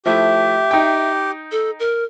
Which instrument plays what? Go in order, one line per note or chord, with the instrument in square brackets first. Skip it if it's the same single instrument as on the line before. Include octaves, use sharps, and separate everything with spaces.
[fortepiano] F3 A3 E4 [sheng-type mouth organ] G4 [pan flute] E5
[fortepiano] D#4 G5
[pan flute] A4
A#4